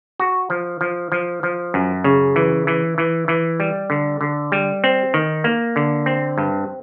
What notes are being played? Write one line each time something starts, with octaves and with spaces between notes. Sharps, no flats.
F#4
F3
F3
F3
F3
F#2
C#3
E3
E3
E3
E3
G3
D3
D3
G3
C4
D#3
A#3
D3
C4
G2